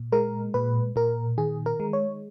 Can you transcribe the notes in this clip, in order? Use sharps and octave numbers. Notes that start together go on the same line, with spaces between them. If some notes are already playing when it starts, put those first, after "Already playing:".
Already playing: A#2
G#3 A#4
A#2 B4
A#2 A#4
D#3 G#4
A#4
G#3
C#5